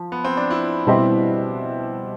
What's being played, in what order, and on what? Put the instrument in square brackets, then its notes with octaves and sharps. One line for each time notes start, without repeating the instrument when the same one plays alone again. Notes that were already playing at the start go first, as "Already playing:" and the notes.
Already playing: [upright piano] F3
[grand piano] B3
C4
D4
E4
[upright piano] B2 G3 C4 E4 G4